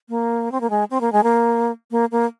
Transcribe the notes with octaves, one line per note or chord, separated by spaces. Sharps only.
A#3
C4
A#3
G#3
C4
A#3
G#3
A#3
A#3
A#3